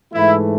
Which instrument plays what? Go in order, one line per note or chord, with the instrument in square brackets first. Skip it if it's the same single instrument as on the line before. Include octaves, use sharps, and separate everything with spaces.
[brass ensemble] G#2 E3 A3 E4